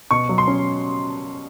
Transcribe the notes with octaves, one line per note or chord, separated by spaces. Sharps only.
B2 C#6
F#3
C6
C#4